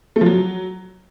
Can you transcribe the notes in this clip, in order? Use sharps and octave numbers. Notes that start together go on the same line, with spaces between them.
A3
F3
F#3